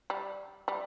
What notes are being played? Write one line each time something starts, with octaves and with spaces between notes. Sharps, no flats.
G3
G3